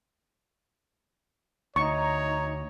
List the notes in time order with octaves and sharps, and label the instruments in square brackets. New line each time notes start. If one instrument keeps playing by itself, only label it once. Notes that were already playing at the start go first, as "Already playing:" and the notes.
[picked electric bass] D2 [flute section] D#4 A#5 [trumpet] C#5 [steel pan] C#6